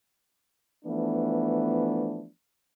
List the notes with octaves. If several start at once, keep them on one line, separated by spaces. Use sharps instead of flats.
E3 F3 A3 B3 D4